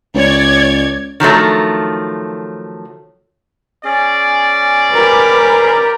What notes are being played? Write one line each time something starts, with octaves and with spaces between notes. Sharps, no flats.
C#2 C#5 D5 G#6
D#3 F3 F#3 A3
C#4 G#4 D5
G4 A#4 B4